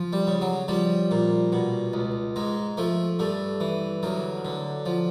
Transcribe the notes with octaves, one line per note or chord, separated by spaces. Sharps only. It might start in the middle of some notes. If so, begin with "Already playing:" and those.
Already playing: F3
G3
C#3
F#3
F3 G3
A#2
B2
C#2
G#2 G#3
F3 A3
G2 A3
E3
D2 F#3
D3
F3